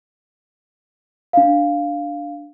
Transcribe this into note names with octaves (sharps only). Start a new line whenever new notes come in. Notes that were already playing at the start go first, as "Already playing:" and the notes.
D4 F5